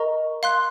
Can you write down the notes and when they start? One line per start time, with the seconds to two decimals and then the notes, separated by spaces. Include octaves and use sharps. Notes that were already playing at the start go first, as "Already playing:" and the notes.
Already playing: A#4 D#5 A#5 C#6
0.43 F5 C6 F#6